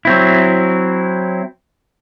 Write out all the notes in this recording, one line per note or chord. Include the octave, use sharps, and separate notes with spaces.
F#3 C4 E4